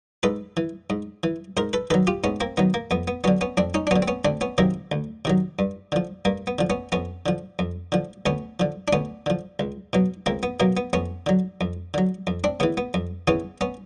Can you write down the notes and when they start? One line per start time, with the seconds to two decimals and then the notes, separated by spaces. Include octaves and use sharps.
0.23 G#2 A4 B4
0.57 E3
0.90 G#2
1.23 E3
1.57 G#2 A#4 C5
1.73 A4 B4
1.90 D#3 F#3 A4 B4
2.07 F4 G4
2.24 G#2 B3 C#4
2.40 A#3 C4
2.57 D#3 F#3 B3
2.74 A#3
2.91 F2 B3
3.08 B3
3.24 D3 F#3 B3 C#4
3.41 B3 C#4
3.57 F2 C4 D4
3.74 C#4 D#4
3.87 D4
3.91 D3 F#3 B3 C#4
4.02 C4
4.08 B3 C#4
4.25 D2 C4 D4
4.41 B3 C#4
4.58 C3 D#3 F#3 A#3 C4
4.92 D2
5.25 C3 D#3 F#3
5.59 G2
5.92 D3 F3
6.25 G2 A#3
6.47 B3
6.59 D3 F3
6.70 B3 C#4
6.92 F2 B3 C#4
7.26 D3 F3
7.59 F2
7.92 D3 F3
8.26 D2 B3 C#4
8.60 D3 F3
8.88 D4
8.93 D2 B3 C#4
9.26 D3 F3
9.59 C#2
9.93 B2 F#3
10.26 C#2 A#3 C4
10.43 B3
10.60 B2 F#3 A#3
10.77 B3
10.93 F2 B3 C#4
11.26 D3 F#3
11.61 F2
11.94 D3 F#3
12.27 F2
12.44 C4 D4
12.60 C#3 E3 B3
12.77 B3
12.94 F2
13.27 C#3 E3 B3 C#4
13.61 B3 C#4